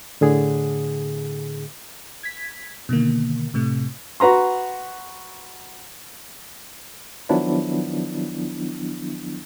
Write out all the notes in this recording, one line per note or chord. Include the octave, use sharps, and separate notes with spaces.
A2 D3 G#4
G#6 B6
B2 D3 D#3 A#3
A2 C3 A3
F#4 B4 A#5 C6
D#3 F3 F#3 B3 D4 E4